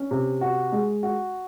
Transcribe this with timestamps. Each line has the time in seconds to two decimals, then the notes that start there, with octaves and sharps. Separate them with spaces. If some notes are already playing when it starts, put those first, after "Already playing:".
Already playing: C#4
0.11 C3
0.41 F#4
0.72 G#3
1.03 F#4